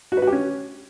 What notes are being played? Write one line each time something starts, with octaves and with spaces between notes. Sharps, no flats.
F#4
B4
F#4
G4
C#4